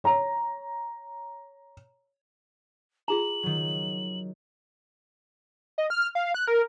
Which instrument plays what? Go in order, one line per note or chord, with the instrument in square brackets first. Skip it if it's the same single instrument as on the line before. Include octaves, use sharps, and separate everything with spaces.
[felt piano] C#5 A#5
[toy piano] F4 G#4 A#5 [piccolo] F#7
[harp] D#3 F#3
[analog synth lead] D#5
F6
F5
F#6
A#4